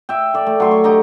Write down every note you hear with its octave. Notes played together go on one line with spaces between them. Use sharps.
E5 G5
A4 D5
A3
F#3 C6 C#6
C#5
D3 G4 D#5 A#5